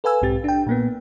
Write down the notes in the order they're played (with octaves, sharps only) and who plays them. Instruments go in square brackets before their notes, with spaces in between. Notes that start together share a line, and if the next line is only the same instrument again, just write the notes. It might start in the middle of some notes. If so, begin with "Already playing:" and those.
[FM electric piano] A4 B4 F5 G#5 E6
B1 G#2 C4 G4 A6
D4 G5
A#2 A#3 B3